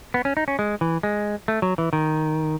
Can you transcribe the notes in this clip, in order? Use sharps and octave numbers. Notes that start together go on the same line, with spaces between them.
B3
C#4
D#4
C#4
G#3
E3
G#3
A3
F#3
E3
D#3